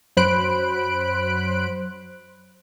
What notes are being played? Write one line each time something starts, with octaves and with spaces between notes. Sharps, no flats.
F#2 F#3 C5 B5 F#6 D7